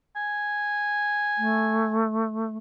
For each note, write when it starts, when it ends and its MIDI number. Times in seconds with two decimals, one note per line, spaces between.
0.16 2.07 80
1.38 2.57 57